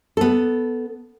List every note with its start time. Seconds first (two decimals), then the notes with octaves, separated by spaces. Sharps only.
0.17 B3 A4